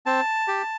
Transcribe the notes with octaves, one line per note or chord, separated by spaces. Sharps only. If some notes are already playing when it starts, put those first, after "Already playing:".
C4 A5
G4